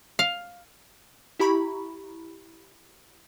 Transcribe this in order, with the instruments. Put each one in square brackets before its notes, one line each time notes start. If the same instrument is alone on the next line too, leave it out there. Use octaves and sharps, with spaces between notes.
[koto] F5
[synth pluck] E4 G4 A#5 B5 C#6